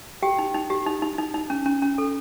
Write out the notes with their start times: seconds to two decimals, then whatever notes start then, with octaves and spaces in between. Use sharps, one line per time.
0.23 G4 G5
0.39 D#4
0.54 D#4
0.70 G4
0.87 D#4
1.02 D#4
1.18 D#4
1.34 D#4
1.50 C#4
1.66 C#4
1.82 C#4
1.98 A4